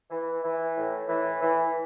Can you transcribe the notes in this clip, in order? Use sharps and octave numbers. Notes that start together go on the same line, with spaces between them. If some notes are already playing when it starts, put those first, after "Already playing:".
E3
E3
A2
E3
E3